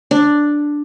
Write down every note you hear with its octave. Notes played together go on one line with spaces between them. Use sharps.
D4